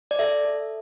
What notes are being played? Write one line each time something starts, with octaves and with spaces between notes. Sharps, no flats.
D5
A4 E5
A4